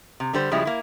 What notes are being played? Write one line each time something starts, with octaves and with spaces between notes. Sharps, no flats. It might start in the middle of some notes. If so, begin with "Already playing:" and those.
C3
D3 G3 C5
C#3 F3 G3 G#3 E4
A#3 E4